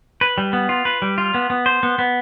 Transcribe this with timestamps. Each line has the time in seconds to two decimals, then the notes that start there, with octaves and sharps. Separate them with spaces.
0.21 B4
0.38 G3
0.53 B3
0.69 F4
0.85 B4
1.02 G3
1.18 F4
1.34 B3
1.50 B3
1.66 C5
1.83 B3
1.99 B3